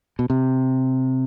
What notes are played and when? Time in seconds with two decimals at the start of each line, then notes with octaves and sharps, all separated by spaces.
0.19 B2
0.30 C3